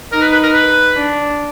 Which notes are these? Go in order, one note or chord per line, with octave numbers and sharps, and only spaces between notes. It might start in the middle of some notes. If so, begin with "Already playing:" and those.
D#4 A#4
B4
B4
A#4
B4
D4